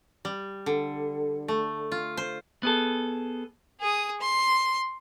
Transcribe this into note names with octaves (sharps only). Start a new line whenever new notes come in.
G3
D3
A3
F4
C5
B3 G#4 A4
G#4 D#6
C6